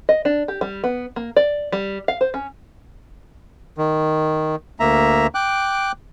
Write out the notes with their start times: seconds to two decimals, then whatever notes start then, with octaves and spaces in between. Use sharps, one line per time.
0.09 D#5
0.25 D4
0.48 G4
0.61 G3
0.84 B3
1.16 A#3
1.37 D5
1.72 G3
2.08 F5
2.21 C5
2.34 C#4
3.78 D#3
4.80 D2 A#3 E5 A#5
5.35 G5 D6 F#6